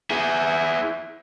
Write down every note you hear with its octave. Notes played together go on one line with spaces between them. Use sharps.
E4 G#4